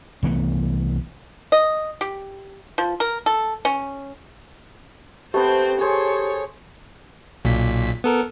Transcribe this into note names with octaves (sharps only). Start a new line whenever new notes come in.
C2 E3 A3 B3
D#5
G4
F3
A#4
A4
C#4
A3 B3 C4 G4 C5
G#4 A4 C5 C#5
B1 A#2 B6
B3 A4 A#4